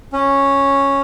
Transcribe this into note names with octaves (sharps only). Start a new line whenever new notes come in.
C#4